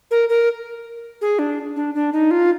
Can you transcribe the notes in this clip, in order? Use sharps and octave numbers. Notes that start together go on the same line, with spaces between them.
A#4
A#4
G#4
D4
D4
D4
D#4
F4